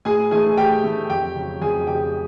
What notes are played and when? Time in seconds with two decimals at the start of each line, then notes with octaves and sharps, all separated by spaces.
0.05 A2 G#4 G#5
0.31 E3 A3 G#4 G#5
0.57 A2 G4 G5
0.84 E3 A3
1.10 F2 G4 G5
1.35 C#3 F#3
1.61 F2 G#4 G#5
1.87 C#3 F#3 G4 G5